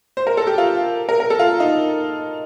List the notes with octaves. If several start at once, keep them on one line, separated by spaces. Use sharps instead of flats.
C5
A#4
A4
G4
F4
A#4
A#4
A4
F4
D#4